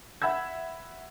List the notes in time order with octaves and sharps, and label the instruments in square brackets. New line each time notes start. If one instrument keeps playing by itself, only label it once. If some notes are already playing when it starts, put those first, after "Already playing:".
[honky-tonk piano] E5 F#5 B5 E6 G#6